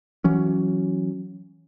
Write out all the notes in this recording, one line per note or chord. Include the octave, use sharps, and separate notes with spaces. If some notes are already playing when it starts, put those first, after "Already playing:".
E3 F#3 C#4